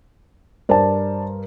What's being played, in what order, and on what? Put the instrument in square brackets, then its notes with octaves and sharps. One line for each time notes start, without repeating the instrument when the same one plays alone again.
[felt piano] G2 A#4 C5 [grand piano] D5 A5